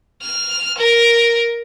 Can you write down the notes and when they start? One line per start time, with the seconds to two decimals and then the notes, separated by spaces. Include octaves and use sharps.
0.22 F6
0.78 A#4